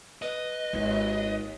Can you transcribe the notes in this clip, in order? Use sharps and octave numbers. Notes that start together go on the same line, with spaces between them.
B4 D#5
G#1 D#2 E4